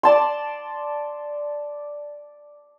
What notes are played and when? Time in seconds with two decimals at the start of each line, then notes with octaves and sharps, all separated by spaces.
0.03 D5 A5 C6